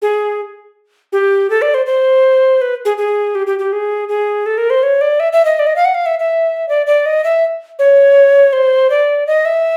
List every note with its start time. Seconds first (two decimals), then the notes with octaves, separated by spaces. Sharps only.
0.02 G#4
1.13 G4
1.50 A4
1.62 D5
1.74 C5
1.86 C5
2.61 B4
2.85 G#4
2.98 G#4
3.35 G4
3.47 G4
3.59 G4
3.73 G#4
4.09 G#4
4.46 A4
4.58 A#4
4.70 C5
4.83 C#5
5.01 D5
5.20 E5
5.33 E5
5.45 D#5
5.59 D5
5.67 D#5
5.76 F5
5.85 F#5
5.95 F5
6.06 E5
6.19 E5
6.69 D5
6.87 D5
7.06 D#5
7.24 E5
7.79 C#5
8.53 C5
8.90 D5
9.27 D#5
9.45 E5